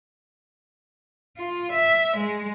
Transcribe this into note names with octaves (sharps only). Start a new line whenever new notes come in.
F4
E5
G#3